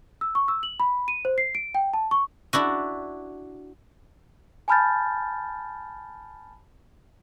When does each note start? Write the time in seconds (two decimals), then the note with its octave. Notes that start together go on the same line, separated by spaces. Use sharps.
0.21 E6
0.35 C#6
0.48 E6
0.63 F#7
0.80 B5
1.08 D#7
1.25 C5
1.38 C7
1.55 D7
1.75 G5
1.94 A5
2.11 C#6
2.53 D4 E4 F#4
4.68 G#5 A5 B5 F6 G6 A6